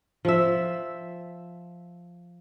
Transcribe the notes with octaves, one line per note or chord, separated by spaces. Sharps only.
F3 E5